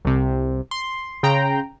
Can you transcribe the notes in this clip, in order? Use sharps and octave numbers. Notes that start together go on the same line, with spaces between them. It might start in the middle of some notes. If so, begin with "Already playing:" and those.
C2 C3
C6
C#3 G5 A#5